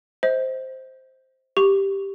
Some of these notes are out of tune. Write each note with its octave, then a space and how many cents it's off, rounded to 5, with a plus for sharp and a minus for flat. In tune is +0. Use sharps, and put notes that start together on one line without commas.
C5 +0 D#5 +40
G4 +0 C#6 +0